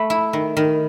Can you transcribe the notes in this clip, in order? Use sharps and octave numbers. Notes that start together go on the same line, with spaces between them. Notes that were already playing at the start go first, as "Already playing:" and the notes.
Already playing: A3 B5
E4
D#3
D#3